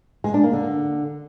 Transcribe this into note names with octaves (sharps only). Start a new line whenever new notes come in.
G#3
D4
A#3
D3